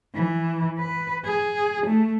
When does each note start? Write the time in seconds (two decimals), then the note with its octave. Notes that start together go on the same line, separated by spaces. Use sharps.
0.15 E3
0.79 B4
1.25 G#4
1.86 A3